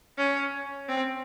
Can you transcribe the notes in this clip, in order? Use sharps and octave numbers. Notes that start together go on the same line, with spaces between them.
C#4
C4